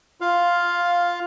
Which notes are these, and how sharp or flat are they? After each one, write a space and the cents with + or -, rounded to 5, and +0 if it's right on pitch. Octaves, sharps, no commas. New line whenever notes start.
F4 +0 F5 +5